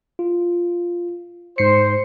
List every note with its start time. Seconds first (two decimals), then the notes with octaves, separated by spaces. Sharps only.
0.19 F4
1.58 G#2 C5 C7 C#7